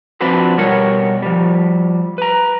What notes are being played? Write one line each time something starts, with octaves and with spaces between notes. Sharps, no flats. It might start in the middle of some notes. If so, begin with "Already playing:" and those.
F3 C4 D4 F#4 B4 C5
B2 G3 A#4 C#5 F#5
F3 G3
B4 A#5